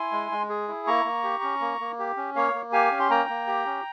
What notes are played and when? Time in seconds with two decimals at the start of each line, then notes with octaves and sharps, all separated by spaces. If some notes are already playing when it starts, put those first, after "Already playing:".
Already playing: E4 G#5 C6
0.12 G#3
0.32 G#3
0.49 G#4
0.68 E4
0.87 A#3 A#5 C#6
1.05 A#3
1.24 G4
1.43 C#4
1.61 A#3
1.81 A#3
1.99 G4
2.17 C#4
2.36 A#3 C#5 F5
2.54 A#3
2.72 G4 F5 G#5
2.92 C#4
3.00 C6
3.10 A#3 G5 A#5
3.29 A#3
3.47 G4
3.66 C#4